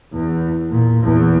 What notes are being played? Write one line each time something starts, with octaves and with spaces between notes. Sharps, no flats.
E2
A#2
E2